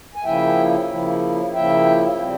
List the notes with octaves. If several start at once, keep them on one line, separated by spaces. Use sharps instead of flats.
G#5
C#3 F3 A#3 E4 E5 G5
C#3 F3 A#3 E4
C#3 F3 A#3 E4 E5 G5
C#3 G3 C4